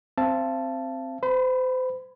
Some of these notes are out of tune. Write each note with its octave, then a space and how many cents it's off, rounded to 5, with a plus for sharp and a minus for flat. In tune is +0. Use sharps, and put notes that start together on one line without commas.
C4 +0 F5 -40 A5 +0
C5 -35 B5 +0